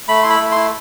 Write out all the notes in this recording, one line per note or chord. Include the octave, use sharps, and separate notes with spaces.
A3 B5
E4 C6
B5
A3
E4 C6